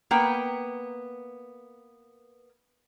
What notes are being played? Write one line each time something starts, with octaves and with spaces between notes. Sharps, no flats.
A#3 B3 G5